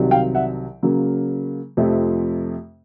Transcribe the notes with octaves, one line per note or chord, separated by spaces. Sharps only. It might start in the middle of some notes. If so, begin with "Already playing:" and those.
Already playing: C2 C3 D#3 F#3
F5 G5
E5 F#5
C#3 F#3 A#3
F2 C3 F3 A3 C4